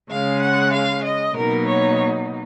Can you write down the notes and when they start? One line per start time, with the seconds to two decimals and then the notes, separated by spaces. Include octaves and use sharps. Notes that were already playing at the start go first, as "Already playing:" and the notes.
0.10 C#3 G#3 C#4 F5
0.42 F#5
0.73 F5
1.04 D#5
1.36 B2 F#3 A#3 D#4 A#4
1.67 C#5